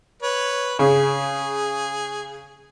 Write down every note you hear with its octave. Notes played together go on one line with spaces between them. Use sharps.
B4 C#5
C#3 G#4